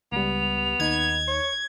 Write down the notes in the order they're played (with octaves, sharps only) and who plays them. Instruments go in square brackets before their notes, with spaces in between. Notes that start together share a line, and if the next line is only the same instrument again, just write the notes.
[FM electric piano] C#2 G3 [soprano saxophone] B3 [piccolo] F7
[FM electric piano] D#2 D#4 [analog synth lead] G#6
[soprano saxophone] C#5